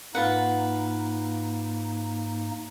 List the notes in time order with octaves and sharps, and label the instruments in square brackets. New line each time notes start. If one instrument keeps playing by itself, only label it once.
[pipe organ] G#2 A#3 D#4 [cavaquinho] F4 B4 F#5